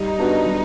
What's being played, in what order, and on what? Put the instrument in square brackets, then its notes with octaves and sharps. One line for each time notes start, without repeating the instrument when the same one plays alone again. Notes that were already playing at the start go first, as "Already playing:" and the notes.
Already playing: [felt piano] G3 [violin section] D#4
[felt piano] B3 D4 F#4 B4
G3